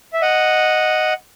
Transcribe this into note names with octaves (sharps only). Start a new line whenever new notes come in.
E5
D#5 F#5